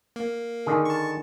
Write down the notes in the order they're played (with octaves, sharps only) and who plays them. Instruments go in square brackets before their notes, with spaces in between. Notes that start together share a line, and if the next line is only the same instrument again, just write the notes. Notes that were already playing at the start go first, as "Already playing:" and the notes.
[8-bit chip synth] A#3
[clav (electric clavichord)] D3 D#3 G#4
[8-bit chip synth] A5 C#6